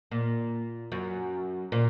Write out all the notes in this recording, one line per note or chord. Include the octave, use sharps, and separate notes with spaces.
A#2
F#2
A#2